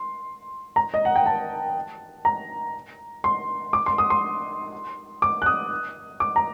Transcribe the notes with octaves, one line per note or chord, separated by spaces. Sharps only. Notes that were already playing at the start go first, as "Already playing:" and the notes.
Already playing: C6
A#5
D#5
F#5
G5
A5
A#5
C6
D6
C6
D#6
C6
D6
F#6
D#6
D6
A#5